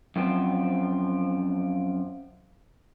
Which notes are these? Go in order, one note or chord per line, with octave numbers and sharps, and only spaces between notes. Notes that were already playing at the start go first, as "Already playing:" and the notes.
F#2 F3 C4